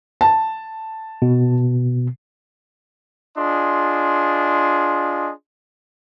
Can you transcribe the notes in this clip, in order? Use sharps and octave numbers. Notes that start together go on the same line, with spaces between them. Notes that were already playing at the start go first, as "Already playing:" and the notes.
A5
B2
D4 F4 G#4 D#5 C6